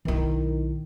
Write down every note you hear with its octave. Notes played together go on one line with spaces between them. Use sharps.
B1 D#3 E4